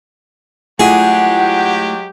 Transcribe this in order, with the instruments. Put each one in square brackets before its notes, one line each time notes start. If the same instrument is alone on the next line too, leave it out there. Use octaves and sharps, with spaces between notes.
[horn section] F#3 G#3 G4 [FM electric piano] A3 E4 F4 [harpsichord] G#4 [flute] F#5